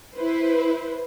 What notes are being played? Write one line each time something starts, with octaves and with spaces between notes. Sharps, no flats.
E4 B4 C5